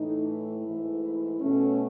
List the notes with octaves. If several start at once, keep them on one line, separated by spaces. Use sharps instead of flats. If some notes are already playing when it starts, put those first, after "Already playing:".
Already playing: A2 E3 A3 D#4
E4
G#2 E3 A3
B2 A3 C#4